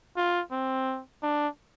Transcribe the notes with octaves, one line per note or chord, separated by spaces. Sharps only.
F4
C4
D4